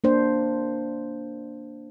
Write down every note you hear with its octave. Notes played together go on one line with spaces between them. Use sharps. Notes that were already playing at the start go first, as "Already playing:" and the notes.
A#3 D4 C5